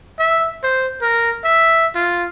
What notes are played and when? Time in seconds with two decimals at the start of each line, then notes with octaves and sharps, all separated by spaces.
0.19 E5
0.63 C5
1.01 A#4
1.44 E5
1.95 F4